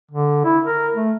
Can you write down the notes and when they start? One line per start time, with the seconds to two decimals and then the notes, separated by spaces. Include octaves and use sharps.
0.11 D3
0.45 E4
0.65 A#4
0.95 A3